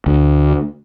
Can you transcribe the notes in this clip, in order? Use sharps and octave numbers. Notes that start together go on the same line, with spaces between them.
D2